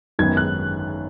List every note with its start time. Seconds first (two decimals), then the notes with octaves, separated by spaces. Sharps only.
0.19 G#1 F#2 D#3 B3 D#4 G#6
0.37 F#6